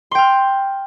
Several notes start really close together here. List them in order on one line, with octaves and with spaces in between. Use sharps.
C6 G5 F6